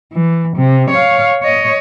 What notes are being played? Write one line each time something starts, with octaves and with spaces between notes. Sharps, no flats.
E3
C3
C#5 F5
C#5 D#5